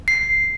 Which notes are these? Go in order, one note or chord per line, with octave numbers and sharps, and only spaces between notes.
C7